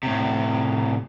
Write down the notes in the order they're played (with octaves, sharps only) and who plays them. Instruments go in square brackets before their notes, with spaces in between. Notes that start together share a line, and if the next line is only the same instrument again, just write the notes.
[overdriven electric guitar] A2 C3